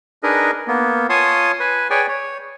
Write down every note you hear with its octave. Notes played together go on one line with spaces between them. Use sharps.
D4 D#4 G#4 A#4 B4 D#5
A#3 B3
F4 C#5 G#5 A5 C6 D#6
B4 G#5
G#4 B4 C#5 D5 G5 G#5
C#5